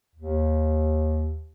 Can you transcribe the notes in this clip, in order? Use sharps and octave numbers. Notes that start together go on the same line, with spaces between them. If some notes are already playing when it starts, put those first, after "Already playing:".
D#2